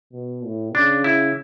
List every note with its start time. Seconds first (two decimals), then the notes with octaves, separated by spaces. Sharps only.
0.13 B2
0.44 A2
0.74 C#3 D4
1.04 E4